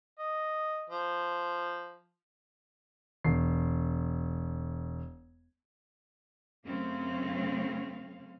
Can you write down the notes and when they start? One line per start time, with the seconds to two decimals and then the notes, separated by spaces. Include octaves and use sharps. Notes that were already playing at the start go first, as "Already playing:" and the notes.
0.19 D#5
0.90 F3
3.24 E1 C7
6.65 F#2 C#3 A3 C4 C#4 F5